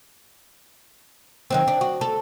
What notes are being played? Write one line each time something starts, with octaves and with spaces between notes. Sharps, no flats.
D#3 F#3 C4
D4
F#4
A4